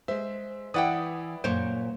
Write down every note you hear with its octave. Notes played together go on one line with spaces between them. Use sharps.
G#3 C5 E5
E3 E4 B4 D5 F#5 G5 D#6
F#2 A#2 C5 C#5 D7